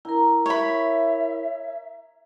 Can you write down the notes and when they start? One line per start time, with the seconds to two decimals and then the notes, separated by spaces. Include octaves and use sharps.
0.05 E4 A#4 A#5
0.46 C#5 E5 B5